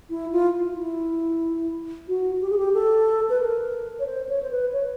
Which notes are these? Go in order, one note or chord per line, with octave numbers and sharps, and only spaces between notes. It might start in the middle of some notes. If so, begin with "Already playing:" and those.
E4
F4
F4
E4
F#4
G4
G#4
G4
A4
B4
A#4
C#5
C5
C#5
C5
B4
C#5